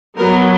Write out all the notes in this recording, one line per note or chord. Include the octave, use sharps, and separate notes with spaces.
F#3 B3 A#4